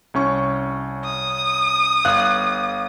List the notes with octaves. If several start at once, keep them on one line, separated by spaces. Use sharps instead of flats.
C2 C#4 C#6
D#6
G1 F5 F#6